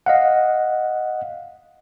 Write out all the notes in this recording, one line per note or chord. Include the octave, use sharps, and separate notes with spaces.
D#5 F5 F#5